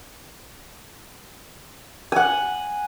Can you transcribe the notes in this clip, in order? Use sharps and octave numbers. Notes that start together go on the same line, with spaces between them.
F#5 G#5